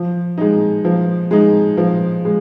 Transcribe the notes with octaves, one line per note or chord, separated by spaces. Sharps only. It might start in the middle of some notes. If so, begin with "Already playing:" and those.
Already playing: F3
G#3 D#4
F3
G#3 D#4
F3
G#3